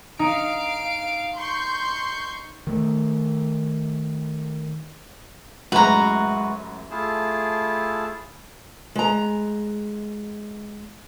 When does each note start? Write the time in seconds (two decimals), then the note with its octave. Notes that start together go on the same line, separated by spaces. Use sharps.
0.19 D#4 F5 D7
1.35 C6 C#6 G6
2.67 D#3 A3
5.72 A1 F#2 G#3 F#4 B4 A#5 C6
6.91 A3 E4 F4 G#4 A5
8.95 G#3 A#5